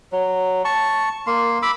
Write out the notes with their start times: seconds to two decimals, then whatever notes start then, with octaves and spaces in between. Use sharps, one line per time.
0.12 F#3
0.65 A5 C#6
1.27 A#3 C6
1.62 B5 D6 E6